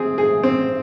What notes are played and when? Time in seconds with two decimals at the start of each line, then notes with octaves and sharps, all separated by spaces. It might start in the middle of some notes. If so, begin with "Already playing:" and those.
Already playing: C4 G#4
0.18 G#4
0.43 C4